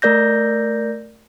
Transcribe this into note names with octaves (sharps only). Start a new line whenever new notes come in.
A3 A#4 D5 G6 A#6